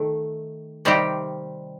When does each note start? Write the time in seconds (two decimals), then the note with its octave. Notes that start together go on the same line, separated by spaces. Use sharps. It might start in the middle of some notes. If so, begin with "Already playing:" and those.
Already playing: D#3 A3
0.85 C3 D#3 G3 C4 G4